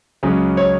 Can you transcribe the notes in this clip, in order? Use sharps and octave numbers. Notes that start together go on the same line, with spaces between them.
C#2 C#3 F#3 C#4
C#5